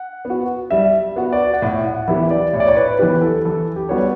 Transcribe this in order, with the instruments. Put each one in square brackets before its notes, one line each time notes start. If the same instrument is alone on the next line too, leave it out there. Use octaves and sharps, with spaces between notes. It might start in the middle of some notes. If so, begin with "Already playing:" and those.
Already playing: [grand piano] F#5
[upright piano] B3
F#4
[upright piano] G3 [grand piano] E5
[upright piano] B3 F#4
[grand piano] D5
F#5
[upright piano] A2 [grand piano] E5
[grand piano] F#5
[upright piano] E3 B3 E4 G4 [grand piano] E5
[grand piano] D5
[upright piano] A2 [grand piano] C#5
[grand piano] D5
C#5
B4
[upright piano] E3 B3 E4 G4 [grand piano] B4
[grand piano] A4
[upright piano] E3 [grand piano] A4
[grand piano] G4
[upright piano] G3 B3 F#4 [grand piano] C#5
[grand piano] B4